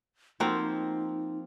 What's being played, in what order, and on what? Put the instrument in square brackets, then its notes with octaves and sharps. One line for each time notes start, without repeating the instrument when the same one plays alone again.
[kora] F3 A#3 C4 [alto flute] D#4 [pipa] F#4 G5 A#5